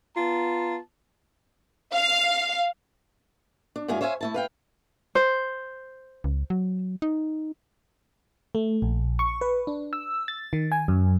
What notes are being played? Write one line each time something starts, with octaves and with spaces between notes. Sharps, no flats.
B3 F4 A5 A#5
F5
D4
G2 F#3 G#3 E4 F4 G#5
C5 C#5 E5 F5 G#5
A3 E4 A5
B4 F5 G5
C5
C#2
F#3
D#4
A3
A#1
C#6
B4
D4
E6
A6
D#3
G#5
F#2